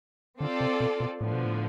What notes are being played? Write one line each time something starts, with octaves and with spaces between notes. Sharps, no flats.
D3 C4 F4 A4 D5
C3
B2
B2
A2 D3 F3 B3
B2
A2